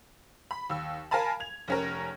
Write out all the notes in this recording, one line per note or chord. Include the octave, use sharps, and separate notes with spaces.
B5
D#2 E6
A#4 F5 G#5 A5 B5
G#6 F7
F1 C#4 A#4